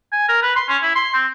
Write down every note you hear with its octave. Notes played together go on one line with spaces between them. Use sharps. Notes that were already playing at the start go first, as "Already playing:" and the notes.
G#5
A#4
B4
C6
C#4
E4
C6
C4